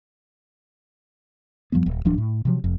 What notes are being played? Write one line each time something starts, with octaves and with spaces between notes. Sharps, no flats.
F2 F3 G3 B3
D#1
D1 F3 F#3 D4
A2
C3 F3 F#3
F1 F2